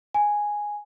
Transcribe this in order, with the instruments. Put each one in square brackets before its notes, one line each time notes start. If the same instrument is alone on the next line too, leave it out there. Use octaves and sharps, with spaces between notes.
[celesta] G#5